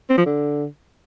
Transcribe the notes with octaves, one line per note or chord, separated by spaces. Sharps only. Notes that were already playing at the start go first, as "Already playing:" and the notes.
C4
F3
D3